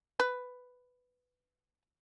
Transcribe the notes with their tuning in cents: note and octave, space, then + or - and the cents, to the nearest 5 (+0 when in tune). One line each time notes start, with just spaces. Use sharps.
B4 +10